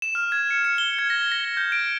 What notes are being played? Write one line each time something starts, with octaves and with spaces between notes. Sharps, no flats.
E7
F6
G#6
C#7
C#7
G7
G#6
A#6
A#6
G7
G6
D7